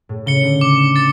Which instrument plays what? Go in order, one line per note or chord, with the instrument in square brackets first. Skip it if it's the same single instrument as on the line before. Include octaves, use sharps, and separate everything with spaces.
[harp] A2
[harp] C#3 [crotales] C#7 G7
[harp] D3
[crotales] D6
A6 C#7